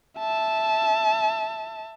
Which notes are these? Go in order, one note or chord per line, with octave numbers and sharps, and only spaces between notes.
E5 A5